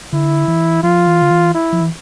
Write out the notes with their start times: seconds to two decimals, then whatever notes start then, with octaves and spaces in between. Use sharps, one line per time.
0.13 D3 E4
0.48 E3
0.83 F3 F4
1.07 E3
1.22 D3
1.31 E3
1.55 E4
1.73 F3
1.81 E3